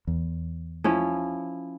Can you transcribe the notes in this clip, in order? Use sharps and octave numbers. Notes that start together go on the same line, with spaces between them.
E2
F3 C#4 E4